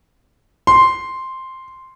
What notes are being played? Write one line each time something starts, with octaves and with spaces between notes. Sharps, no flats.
C6